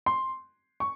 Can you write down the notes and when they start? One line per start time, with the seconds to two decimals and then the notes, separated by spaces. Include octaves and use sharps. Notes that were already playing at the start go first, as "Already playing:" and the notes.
0.06 C6
0.80 C#6